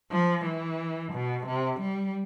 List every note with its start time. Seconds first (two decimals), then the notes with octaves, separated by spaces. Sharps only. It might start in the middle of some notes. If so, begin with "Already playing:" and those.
0.12 F3
0.46 E3
1.12 B2
1.47 C3
1.80 G3